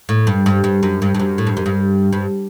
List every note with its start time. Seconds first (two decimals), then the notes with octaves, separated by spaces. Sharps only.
0.09 A2
0.27 G2
0.46 G2
0.64 G2
0.83 F#2
1.02 G2
1.15 G2
1.20 F#2
1.38 A2
1.47 G2
1.57 F#2
1.66 G2
2.13 G2